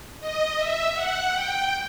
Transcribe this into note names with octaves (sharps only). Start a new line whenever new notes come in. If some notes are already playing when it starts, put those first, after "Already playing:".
D#5
E5
F#5
G5